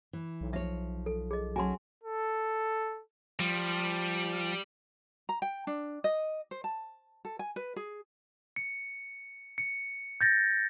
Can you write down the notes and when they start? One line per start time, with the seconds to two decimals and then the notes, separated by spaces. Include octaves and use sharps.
0.13 E3
0.41 B1
0.53 F3 C#5 E5
1.06 A4
1.31 G#4 D#5
1.56 F#3 C#4 F#4 G#5 A5 C6
2.03 A4
3.40 F3 G3
5.29 A#5
5.42 G5
5.67 D4
6.04 D#5
6.51 C5
6.64 A5
7.25 A4
7.39 G#5
7.56 B4
7.76 G#4
8.56 C#7
9.58 C#7
10.21 G6 A6 A#6